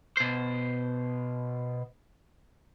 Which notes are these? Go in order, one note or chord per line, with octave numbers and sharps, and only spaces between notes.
B2 C5